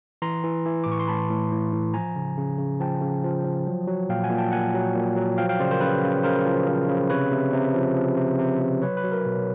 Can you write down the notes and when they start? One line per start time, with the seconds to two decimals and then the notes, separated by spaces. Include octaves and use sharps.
0.22 E3 A#5 C6
0.44 E3
0.66 E3
0.84 A2 D6
0.92 C#6
1.00 C6
1.08 A2 A5 B5
1.30 A2
1.52 A2
1.73 A2
1.94 F3 G#5 A#5
2.16 C#3
2.38 C#3
2.59 C#3
2.80 F3 G5 A5
3.02 C#3
3.24 F3
3.44 F3
3.67 F#3
3.87 F#3
4.09 A#2 F5 G5
4.24 F#5 G#5
4.30 A#2
4.38 G5 A5
4.52 A#2 F#5 G#5
4.74 F#3
4.95 A#2
5.16 F#3
5.38 F3 F5 G5
5.49 F5 G5
5.59 C#3 C5 D5
5.71 A#4 C5
5.81 C#3 B4
6.03 C#3
6.24 C#3 A#4 C5
6.46 F3
6.68 F3
6.88 C#3
7.10 C3 B4 C#5
7.31 C3
7.53 C3
7.75 F3
7.96 F3
8.17 C3
8.39 C3
8.61 C3
8.82 F#3 B4 C#5
8.97 B4
9.04 F#3
9.12 A#4
9.26 B2